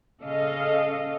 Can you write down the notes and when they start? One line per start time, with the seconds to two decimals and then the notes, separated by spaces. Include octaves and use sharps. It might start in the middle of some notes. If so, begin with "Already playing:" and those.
0.22 C#3 A4 D#5 F5